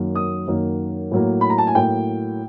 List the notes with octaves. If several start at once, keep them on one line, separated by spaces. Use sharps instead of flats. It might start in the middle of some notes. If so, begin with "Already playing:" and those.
Already playing: F#2 D#3 F#3 A#3
D#6
F#2 D#3 F#3 A#3
A2 F#3 A#3
B5
A#5
A5
G#5
A2 F#3 A#3 G5